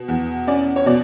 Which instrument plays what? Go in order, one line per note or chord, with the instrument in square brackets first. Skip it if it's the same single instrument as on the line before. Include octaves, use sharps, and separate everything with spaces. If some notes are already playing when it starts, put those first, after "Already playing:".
Already playing: [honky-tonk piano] B2
E2
C#4 D5
C#5
B2 D5